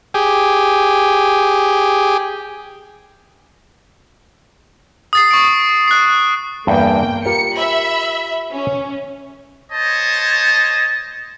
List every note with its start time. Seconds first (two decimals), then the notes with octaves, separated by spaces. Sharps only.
0.14 G4 G#4
5.13 D#6 A6 C7
5.31 C#6 D7
5.88 F#6 C7
6.67 E2 G2 A#3 G5
7.25 F4 G4 A#4 C#7
7.57 E5 B5
8.51 C#4
9.71 C5 C#5 D#5 A5